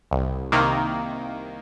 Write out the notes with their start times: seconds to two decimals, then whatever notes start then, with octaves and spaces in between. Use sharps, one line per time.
0.11 C2
0.52 C3 D#3 A#3